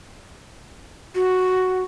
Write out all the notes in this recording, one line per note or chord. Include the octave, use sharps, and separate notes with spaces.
F#4